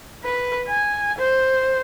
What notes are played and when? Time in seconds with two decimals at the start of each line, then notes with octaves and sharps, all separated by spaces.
0.24 B4
0.67 G#5
1.18 C5